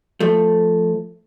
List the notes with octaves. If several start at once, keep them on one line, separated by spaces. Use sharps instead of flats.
F3 A3